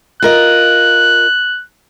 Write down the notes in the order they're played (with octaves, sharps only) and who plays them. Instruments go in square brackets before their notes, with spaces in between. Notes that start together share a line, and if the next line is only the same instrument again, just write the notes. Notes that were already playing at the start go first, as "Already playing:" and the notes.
[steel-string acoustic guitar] F4 A#4 D#5 [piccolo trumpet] F#6